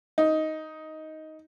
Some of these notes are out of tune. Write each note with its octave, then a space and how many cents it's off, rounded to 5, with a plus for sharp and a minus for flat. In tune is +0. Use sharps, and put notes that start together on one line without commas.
D#4 +10